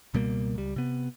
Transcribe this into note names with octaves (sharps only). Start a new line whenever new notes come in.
C#2 B2 G3 A#3
C#2 G3
C3 B3